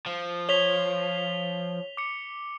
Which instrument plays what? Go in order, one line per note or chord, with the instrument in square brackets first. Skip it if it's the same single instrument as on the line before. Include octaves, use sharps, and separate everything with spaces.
[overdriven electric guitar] F3
[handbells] C#5 [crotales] B6 F7 G7
[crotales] D6 C#7